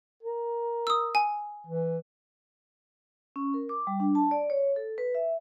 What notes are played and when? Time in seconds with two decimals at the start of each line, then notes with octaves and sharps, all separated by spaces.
0.23 A#4
0.87 D#6 E6
1.15 G#5
1.67 E3
3.36 C#4
3.54 A#4
3.69 D6
3.87 G3
4.00 D4
4.15 A5
4.31 D5
4.50 C#5
4.76 A4
4.98 B4
5.15 E5